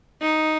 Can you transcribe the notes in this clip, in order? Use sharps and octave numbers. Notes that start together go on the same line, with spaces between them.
D#4